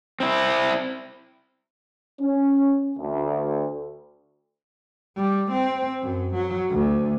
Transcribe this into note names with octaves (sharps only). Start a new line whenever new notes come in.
C4 E4
C#4
D2
G3
C4
F#2
F#3
D2